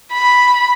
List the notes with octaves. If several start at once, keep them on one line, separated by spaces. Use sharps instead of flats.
B5